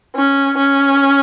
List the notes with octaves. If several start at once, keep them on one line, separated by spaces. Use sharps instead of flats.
C#4
C#4